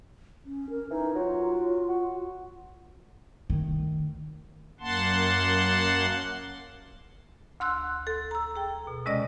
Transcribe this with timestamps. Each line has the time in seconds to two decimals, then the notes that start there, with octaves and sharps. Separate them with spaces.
0.45 C#4
0.70 A#4
0.91 E3 D#4
1.15 F#3 F4
1.88 F#4
3.50 D#3 A3
4.80 F#2 A#3 F#5 A5 C6
7.60 D2 C6 E6 F#6
8.07 A4
8.31 A#5 E6
8.56 G#4 G5
8.87 B2
9.06 C3 G#3 C#4 D5 D#5 A#6